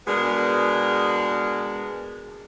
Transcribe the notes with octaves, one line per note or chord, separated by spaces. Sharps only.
B2 G#3 B3 D4 G#4 A#4